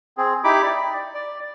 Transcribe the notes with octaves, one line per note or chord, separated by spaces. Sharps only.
C4 G#4
D#4 E4 G4 B5 D6
D5
D5